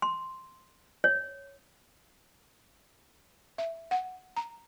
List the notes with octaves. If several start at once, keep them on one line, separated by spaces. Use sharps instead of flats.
C6
C#5
E5
F#5
A#5